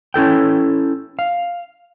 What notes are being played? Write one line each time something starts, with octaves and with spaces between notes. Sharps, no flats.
C#4 E4 A4 G5
F5